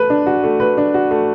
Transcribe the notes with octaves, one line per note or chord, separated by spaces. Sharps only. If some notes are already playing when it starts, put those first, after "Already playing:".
Already playing: A3 B4
D4
F#4
A3
B4
D4
F#4
A3